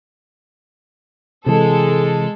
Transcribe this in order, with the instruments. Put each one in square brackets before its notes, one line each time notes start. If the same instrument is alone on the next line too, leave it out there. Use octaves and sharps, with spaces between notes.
[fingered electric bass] C3 E3 [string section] G#3 A4